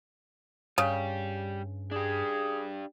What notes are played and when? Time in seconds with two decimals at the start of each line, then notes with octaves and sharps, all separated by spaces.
0.78 G2 C#3 G3 G4
1.91 D4 G4 G#4